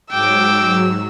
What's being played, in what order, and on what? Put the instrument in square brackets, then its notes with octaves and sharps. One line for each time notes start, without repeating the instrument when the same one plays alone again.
[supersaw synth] G#2 F#3 [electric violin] G5 D6 [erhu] E6